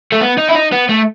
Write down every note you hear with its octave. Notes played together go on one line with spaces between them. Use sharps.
A3
B3
D#4
E4
D#4
B3
A3